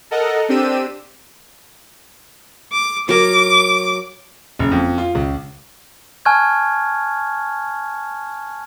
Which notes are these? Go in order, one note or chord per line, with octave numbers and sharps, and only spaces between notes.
A4 A#4 D#5 F#5
C4 D4 G4 E6 D#7
D6
F#3 A#4 D6
F#1
F2
F4
C#2
G#5 A5 C#6 F6 F#6 G#6